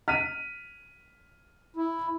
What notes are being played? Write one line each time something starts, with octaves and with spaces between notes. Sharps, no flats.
F6 B6 D#7
E4